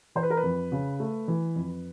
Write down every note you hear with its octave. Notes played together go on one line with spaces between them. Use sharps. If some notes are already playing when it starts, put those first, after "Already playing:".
E3 C5
B4
A#4
B4
F2
C#3
A3
E3
F2